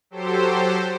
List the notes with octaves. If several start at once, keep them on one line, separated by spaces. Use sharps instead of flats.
F#3 G4 A4 C5